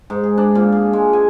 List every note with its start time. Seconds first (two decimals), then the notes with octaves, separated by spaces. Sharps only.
0.10 G#2
0.23 G#4
0.38 D4
0.55 A#2
0.72 G#4
0.93 G#3
1.13 G#5